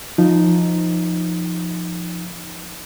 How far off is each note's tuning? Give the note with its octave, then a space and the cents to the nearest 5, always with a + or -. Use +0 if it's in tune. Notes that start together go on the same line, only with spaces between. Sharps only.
F3 +0 D#4 +0